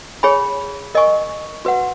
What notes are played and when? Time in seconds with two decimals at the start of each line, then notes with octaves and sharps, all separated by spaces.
0.23 G#4 C#5 G#5 B5
0.95 A#4 D#5 G#5 C#6
1.65 F#4 B4 F#5